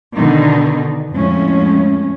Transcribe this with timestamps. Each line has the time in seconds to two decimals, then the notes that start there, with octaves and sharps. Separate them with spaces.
0.15 B2 D3 D#3 D#4
1.12 F2 A2 G#3 C#4